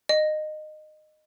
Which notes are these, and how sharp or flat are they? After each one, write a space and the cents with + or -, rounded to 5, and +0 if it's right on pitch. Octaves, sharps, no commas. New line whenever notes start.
D#5 -20